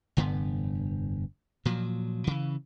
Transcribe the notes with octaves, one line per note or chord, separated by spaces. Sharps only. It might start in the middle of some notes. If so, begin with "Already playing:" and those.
F1 G2 D3 B3
A#2 F3 F#3
C#3 E3